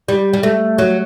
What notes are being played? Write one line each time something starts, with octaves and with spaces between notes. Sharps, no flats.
G3
G3
A3
F#3